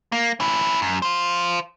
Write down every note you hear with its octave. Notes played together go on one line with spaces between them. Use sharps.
A#3
C#4 E4
F#2
F4 C5